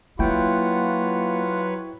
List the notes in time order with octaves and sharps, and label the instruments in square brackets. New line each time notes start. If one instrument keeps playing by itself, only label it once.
[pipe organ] F#3 B4 C#5 [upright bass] A#3 [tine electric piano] E4 G5 [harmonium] F4 F#5